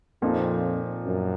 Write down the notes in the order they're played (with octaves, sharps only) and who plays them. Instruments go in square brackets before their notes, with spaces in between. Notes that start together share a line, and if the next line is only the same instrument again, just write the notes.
[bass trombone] F2 [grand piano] A#2 F3 C4 D#4
[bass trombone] F#2